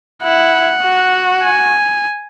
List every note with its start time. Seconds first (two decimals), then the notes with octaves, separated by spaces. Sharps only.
0.23 E4 F#5
0.83 F#4
1.43 G#5